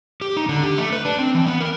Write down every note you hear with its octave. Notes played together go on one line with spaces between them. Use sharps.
G4
D#4
D3
G4
A3
B4
D4
C4
E3
B3
A#4